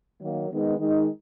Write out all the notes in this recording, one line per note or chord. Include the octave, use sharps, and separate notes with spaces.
D#3 F#3 A#3
D#3 G#3 B3 D#4
D#3 G#3 D#4